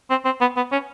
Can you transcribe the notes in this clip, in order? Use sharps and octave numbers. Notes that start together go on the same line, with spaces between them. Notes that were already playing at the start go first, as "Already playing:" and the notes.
C4
C4
B3
B3
C#4